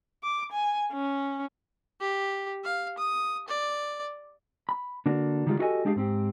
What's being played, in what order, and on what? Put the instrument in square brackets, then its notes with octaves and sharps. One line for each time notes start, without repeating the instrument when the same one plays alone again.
[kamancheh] D6
G#5
C#4
[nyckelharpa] G4
F5
D#6
D5
[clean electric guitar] B5
D3 A#3 D4 F#4
D3 D#3 G3 G#3 C4 F4
E4 F#4 G4 A4 D#5 G#5
G#3 D4 G4 G#4 E5 F5
G#2 C4 G4